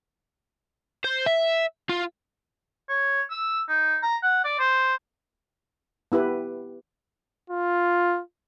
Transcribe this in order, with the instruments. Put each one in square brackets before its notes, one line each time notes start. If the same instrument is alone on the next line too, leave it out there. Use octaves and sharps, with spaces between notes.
[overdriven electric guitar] C5
E5
F4
[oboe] C#5
E6
D#4
A#5
F#5
D5
C5
[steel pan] B3 E4 G4 B4
[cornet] F4